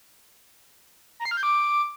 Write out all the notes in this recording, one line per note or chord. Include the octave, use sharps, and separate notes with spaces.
A#5
C7
F6
G6
D6